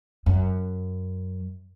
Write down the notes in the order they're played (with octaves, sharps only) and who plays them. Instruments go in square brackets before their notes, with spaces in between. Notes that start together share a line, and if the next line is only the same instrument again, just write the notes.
[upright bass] F#2